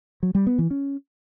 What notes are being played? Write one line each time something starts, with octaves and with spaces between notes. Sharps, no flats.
F#3
G3
B3
E3
C#4